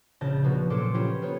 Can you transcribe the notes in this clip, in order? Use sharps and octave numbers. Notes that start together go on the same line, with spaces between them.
A#1 C#3 A5 G6 A#6
B2 F3 A#3 F#4
A#2 F#3 A4 C5 D6 C#7
B3 C#4 F4 G4 C5
A#3 B3 C5 C#5